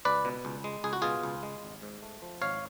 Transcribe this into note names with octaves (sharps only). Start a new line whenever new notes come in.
C#2 B4 D5
B2
C#2
G#3
C#2 G#4
F#4
B2 F4 G#4
C#2
G#3
G#1
G#2
A3
F3
G#1 C#5 F5